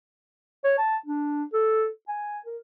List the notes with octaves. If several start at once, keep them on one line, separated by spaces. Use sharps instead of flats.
C#5
A5
D4
A4
G#5
A#4